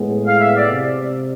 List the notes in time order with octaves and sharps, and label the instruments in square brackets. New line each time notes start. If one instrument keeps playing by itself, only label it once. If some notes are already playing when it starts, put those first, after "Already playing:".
Already playing: [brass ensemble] A2 G#3 B3
[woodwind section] F5
E5
D5
[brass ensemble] C3